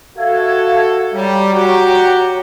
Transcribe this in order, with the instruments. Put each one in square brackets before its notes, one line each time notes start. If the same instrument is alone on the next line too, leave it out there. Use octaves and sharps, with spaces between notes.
[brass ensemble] F#4 A4 [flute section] E5 F5 G#6
[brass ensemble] G3 [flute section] C#5 G5 A#5
[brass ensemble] F#4 G4